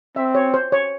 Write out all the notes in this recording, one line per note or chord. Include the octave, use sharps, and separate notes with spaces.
C4 E5
C#5
C5
C#5